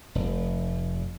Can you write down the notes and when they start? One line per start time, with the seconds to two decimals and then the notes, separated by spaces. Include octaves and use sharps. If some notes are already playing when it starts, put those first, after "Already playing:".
0.15 F1